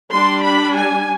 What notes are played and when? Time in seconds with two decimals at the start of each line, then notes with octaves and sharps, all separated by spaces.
0.11 G3 D4 C6
0.43 B5
0.75 G#5